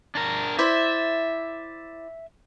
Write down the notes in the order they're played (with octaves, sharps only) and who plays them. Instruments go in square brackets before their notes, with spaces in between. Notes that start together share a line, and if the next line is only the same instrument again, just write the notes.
[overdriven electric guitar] D4 A#4
[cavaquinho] E4 C5 D5 [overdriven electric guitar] E5